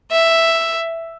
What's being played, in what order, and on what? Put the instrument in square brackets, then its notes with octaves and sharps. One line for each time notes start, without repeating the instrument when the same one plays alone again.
[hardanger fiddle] E5